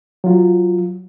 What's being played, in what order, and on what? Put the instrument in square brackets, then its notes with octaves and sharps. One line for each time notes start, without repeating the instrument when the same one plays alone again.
[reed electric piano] F#3 F4